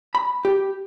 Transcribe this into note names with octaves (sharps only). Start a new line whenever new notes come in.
B5
G4